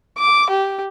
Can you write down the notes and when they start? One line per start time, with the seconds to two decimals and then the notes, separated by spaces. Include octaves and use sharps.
0.18 D6
0.50 G4